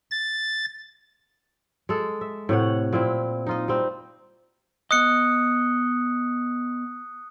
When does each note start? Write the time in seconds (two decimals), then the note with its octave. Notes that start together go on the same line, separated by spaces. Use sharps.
0.11 A6
1.89 G#3 A4
2.21 E5
2.49 A2 C3 C#5 F#5
2.93 A#2 C4 E4
3.47 D#4 F4 D#5
3.68 G3 C4
4.91 B3 D#5 D#6 F#6 C#7